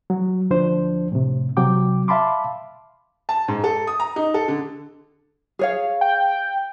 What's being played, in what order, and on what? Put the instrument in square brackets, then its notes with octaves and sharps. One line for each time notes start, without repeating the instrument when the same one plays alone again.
[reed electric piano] F#3
D2 F3 D4 C5
A2 C3
C3 F#3 G5 D6
E5 F5 A5 B5 C6 D6
[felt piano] A5
G#2
A4
D#6
A#5
D#4
A4
D3
[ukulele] G#4 C#5 F5
[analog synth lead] G5